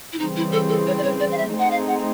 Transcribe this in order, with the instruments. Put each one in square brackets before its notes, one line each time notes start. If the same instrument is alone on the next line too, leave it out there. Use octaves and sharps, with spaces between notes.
[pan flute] E4
[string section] C#3 E3 G3 C4 [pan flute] D#4
[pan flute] E4
A4
A4
C#5
D5
C#5
D5
F5
E5
[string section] A3 C4 D#4 G#4 [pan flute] F#5
[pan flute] F5
F#5